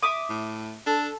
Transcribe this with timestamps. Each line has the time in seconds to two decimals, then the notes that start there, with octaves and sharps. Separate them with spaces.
0.02 E5 D6 D#6
0.29 A2
0.86 D4 A4